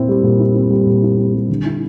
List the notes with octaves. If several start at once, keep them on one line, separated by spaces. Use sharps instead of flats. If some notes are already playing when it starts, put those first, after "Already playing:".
Already playing: A#2 C4 E4
G3
A#2
E4
C4
G3
A#2
E4
C4
G3
D3
E4